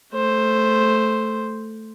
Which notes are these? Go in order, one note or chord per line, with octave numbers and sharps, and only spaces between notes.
A3 C5